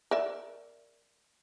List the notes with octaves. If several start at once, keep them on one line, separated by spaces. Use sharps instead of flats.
A#4 D5 E5